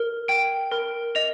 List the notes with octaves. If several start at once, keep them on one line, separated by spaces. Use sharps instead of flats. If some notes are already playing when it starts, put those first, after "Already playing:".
Already playing: A#4
G5 D7
A#4
D#5 F7